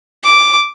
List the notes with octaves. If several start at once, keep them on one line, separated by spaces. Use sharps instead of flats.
D6